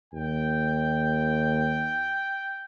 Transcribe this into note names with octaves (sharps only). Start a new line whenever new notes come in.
D#2 G5